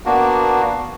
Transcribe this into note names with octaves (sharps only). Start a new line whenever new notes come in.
A#3 B3 D4 F#4